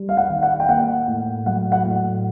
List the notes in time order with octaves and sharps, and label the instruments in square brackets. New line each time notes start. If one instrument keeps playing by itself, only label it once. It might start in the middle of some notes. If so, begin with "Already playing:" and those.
Already playing: [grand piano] G3
F5
F#5
D#3
F#5
G5
A#3 F#5
A2
F#3 F#5
F#5
A2